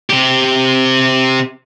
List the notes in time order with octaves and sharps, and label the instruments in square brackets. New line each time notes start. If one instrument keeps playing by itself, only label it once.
[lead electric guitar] C3 G4